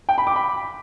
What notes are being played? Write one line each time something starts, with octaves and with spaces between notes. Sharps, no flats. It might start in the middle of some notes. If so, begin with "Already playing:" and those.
G5
B5
D6
B5